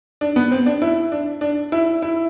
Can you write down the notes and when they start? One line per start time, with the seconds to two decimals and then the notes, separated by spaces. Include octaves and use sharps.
0.21 D4
0.36 B3
0.51 C4
0.66 D4
0.82 E4
1.12 D4
1.41 D4
1.72 E4
2.02 E4